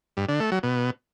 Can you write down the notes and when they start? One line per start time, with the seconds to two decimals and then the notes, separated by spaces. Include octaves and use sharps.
0.17 G2
0.28 D3
0.40 A3
0.52 F#3
0.63 B2